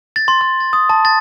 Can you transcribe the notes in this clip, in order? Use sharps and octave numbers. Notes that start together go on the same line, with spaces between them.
A6
C6
C6
A6
D#6
A5
A6